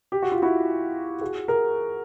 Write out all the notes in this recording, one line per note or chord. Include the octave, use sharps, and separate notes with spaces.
G4
F#4
F4
E4 F#4
F#4 G#4
G#4 A#4